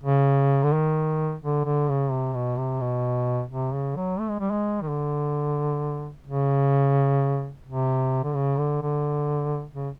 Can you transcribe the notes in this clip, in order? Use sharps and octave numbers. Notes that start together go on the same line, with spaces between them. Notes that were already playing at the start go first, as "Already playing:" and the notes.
C#3
D3
D#3
D3
D3
C#3
C3
B2
C3
B2
C3
C#3
F#3
A3
G#3
G3
G#3
D#3
D3
C#3
C3
D3
C#3
D3
D3
C#3